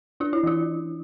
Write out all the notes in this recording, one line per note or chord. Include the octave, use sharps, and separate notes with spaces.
D4 F4
E4
E3 F4